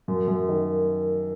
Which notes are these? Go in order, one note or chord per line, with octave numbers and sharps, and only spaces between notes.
F#2
F#2
D#3